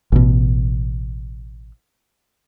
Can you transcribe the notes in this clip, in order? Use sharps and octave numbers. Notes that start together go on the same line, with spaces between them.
A1 B2